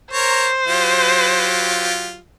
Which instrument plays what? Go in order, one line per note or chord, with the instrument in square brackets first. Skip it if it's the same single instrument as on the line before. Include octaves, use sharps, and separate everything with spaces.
[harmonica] A#4 C#5 A#5 [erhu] C5
[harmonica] F#3 F4 G4